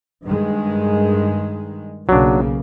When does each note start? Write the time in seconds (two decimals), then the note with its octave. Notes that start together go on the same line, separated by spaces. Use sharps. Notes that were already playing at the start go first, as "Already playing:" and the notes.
0.24 G2 D#3 G#3
2.09 B1 C#3 F#3 A#3 D4